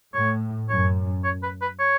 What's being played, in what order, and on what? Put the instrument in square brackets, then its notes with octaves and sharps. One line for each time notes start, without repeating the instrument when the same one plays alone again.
[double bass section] A2 [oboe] C#5
[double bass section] F#2 [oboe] C#5
[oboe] C#5
B4
B4
C#5